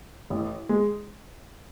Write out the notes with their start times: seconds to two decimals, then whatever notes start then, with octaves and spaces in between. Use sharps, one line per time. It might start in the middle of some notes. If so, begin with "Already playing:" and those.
0.30 A1
0.69 G#3